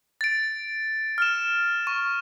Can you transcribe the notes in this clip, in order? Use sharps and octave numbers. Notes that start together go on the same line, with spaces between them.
A6 D7
F6 E7
C#6